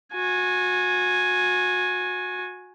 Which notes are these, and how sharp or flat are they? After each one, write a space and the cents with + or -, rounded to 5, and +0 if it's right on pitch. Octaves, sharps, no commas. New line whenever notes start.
F#4 -30 G#5 +0